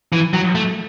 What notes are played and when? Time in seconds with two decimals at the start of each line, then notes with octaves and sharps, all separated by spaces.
0.13 E3
0.34 F#3
0.55 A3